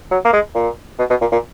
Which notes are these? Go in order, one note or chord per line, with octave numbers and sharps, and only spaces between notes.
F#3
A#3
G#3
A#2
B2
B2
A#2
A#2